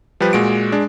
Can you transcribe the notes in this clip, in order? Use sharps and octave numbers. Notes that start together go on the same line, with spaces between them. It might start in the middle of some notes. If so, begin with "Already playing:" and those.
F3 G3 G4 B4
A#2 G#3 F#4 D7
G#3 D4